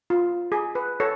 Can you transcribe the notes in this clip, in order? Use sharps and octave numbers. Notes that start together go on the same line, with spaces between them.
F4
G#4
B4
A4 C#5